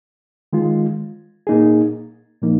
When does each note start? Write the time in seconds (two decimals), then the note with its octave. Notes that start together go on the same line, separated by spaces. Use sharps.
0.53 D#3 G#3 F4
1.47 A#2 A#3 D#4 G#4
2.42 A#2 F3 A#3 D#4